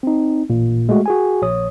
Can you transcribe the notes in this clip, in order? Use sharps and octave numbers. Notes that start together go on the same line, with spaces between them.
C4 D#4
A1 A#2
G#3 A3 F#4
F#4 G#4 G#5
A#1 C#5 D#6